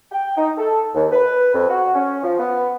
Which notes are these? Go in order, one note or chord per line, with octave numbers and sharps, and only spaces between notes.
G5
D#4
A4
D#2
B4
F2
F#4
C#4
F3
B3